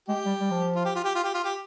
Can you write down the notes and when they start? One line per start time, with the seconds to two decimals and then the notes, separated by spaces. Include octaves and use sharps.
0.08 G#3 G4
0.26 G3
0.41 G3
0.51 F3
0.76 F4
0.85 G4
0.96 F4
1.04 G4
1.15 F4
1.24 G4
1.35 F4
1.44 G4